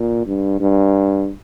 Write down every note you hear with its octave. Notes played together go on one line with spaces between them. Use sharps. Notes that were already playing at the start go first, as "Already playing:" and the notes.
Already playing: A#2
G2
G2